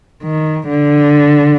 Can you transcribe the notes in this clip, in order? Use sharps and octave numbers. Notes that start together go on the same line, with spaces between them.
D#3
D3